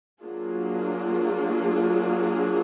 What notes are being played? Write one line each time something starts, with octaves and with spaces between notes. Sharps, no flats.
F#3 A#3 D4 F4 G#4